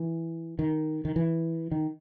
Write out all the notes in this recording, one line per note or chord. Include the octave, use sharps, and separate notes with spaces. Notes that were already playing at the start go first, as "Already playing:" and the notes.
Already playing: E3
D#3
D#3
E3
D#3